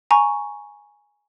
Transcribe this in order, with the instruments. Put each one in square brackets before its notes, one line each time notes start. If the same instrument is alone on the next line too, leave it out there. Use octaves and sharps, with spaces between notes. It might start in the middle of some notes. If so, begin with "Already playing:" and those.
[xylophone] G#5 A#5 C#6